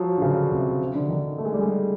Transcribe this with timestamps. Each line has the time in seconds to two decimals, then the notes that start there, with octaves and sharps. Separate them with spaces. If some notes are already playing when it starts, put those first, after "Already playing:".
Already playing: F3 F#3
0.17 D3
0.22 C#3
0.52 C3
0.95 D3
1.09 D#3
1.38 A3
1.45 G#3
1.54 G3
1.60 G#3